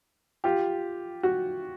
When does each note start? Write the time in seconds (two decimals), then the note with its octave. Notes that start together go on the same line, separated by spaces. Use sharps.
0.44 F4 G4
1.23 F#4